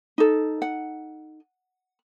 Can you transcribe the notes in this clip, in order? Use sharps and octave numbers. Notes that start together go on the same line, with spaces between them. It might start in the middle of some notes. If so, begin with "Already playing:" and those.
D#4 A4
F#5